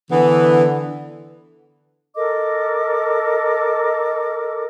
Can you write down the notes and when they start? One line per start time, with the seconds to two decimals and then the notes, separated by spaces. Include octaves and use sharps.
0.11 D3 E3 B3
2.16 A4 A#4 D#5 D6